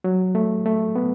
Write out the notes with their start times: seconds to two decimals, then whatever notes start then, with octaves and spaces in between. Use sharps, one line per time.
0.04 F#3
0.35 A3
0.66 A3
0.96 B3